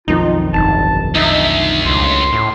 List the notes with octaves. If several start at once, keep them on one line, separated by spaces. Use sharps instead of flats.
B1 F2 D#3 D#4 F4
G1 A5
D2 D#4 E5
C#2 C6
A2